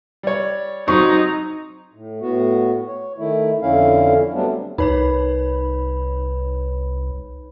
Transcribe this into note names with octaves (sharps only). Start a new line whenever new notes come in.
G3 C#5
F#3 C4 D#4 C#6
A2
A2 B3 F#4
C#5
D#3 A3 E4
F2 D3 C#4 E4 F5
F#3 G3 A3 B3 C4 D4
C2 D#4 B4 C#5 B5